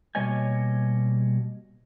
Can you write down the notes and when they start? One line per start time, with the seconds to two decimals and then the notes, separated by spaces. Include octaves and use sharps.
0.15 B2 G3 A#3 C#5 D#5 G#5